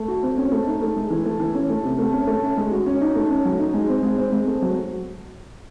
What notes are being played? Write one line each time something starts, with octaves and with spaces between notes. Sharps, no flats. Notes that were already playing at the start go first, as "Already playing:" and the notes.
Already playing: A3
F#4
C4
C#4
A3
D#4
A3
G#3
E3
A3
E3
C#4
A3
C3
A3
C#4
A3
C#4
G#3
F#4
C#4
D#4
A3
C#4
F#3
D#4
G#3
C4
G#3
C4
G#3
A3
F#3